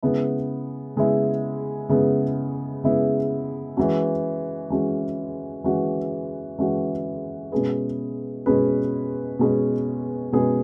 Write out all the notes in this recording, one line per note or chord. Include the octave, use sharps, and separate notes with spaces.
C#3 G#3 B3 E4
C#3 G#3 B3 E4
C#3 G#3 B3 E4
C#3 G#3 B3 E4
E3 G#3 C#4 F#4
E3 G#3 C#4 F#4
E3 G#3 C#4 F#4
E3 G#3 C#4 F#4
B2 G#3 C#4 G#4 B4
B2 G#3 C#4 G#4 B4
B2 G#3 C#4 G#4 B4
B2 G#3 C#4 G#4 B4